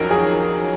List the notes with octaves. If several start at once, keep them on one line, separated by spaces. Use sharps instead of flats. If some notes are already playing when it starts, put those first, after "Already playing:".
Already playing: F2 D#3 F#3 C#4 A#4
G#4